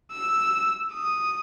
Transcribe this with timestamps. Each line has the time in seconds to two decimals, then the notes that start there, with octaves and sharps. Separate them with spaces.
0.12 E6
0.93 D#6